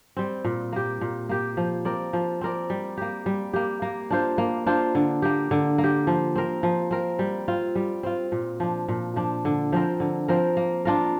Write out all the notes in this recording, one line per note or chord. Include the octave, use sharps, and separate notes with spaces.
G3 C4
A#2
A#3 G4
A#2
A#3 G4
F3
C4 A#4 D5
F3
C4 A#4 D5
G3
A#3 G4
G3
A#3 G4
A#3
D4 F4 C5
A#3
D4 F4 C5
D3
A#3 G4
D3
A#3
G4
F3
C4 A#4
F3
C4 A#4
G3
C4 F4
G3
C4 F4
A#2
F3 D4
A#2
F3 D4
D3
F3 C4 A#4
D3
F3 C4 A#4
A#3
D4 F4 A#4